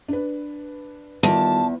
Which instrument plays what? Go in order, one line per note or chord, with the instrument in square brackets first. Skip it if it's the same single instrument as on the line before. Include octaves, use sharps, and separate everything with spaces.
[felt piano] D4 B4
[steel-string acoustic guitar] E2 [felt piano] D#3 G3 F4 [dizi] A5